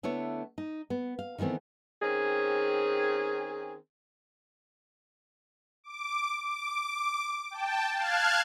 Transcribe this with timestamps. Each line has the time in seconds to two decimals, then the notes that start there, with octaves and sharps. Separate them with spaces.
0.03 D3 A3 B3 E4 C#5
0.58 D#4
0.90 B3
1.19 F5
1.38 D#3 E3 A3 B3 C4
2.02 D#3 C4 C#4 G#4
5.84 D6
6.45 D6
7.50 G5 A5
7.96 F5 A5 F6 F#6 G#6